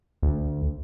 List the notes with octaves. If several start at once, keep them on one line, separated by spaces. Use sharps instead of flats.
D2